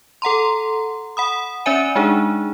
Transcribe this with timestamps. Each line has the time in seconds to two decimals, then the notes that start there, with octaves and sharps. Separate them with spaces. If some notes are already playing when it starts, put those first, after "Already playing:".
0.22 A4 F#5 A#5 C6
1.17 F#5 B5 D#6
1.66 C#4 C#5 D5 E5 G#5 D#7
1.95 G#3 D4 D#4 G#4